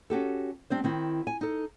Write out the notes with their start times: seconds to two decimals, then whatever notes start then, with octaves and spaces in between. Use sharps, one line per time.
0.10 C#4 F#4 G4 A4
0.70 G3 C4 D4 C5
0.84 D#3 C4 E4
1.27 G#5
1.41 D#4 A4